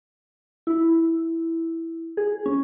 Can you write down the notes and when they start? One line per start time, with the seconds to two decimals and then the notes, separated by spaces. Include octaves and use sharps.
0.67 E4
2.17 G#4
2.46 C#4